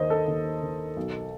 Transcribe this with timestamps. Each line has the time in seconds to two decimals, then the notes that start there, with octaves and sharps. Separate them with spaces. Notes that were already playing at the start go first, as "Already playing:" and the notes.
Already playing: D#2 D#3 C5 D#5
0.10 A4
0.27 D#2
0.63 D#3
0.97 B1